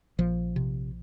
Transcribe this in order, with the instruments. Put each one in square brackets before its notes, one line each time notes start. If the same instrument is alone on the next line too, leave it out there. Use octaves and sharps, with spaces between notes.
[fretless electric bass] A#1 F3
C3